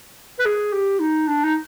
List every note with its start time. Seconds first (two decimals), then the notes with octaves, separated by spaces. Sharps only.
0.39 B4
0.46 G#4
0.73 G4
1.00 D#4
1.28 D4
1.44 D#4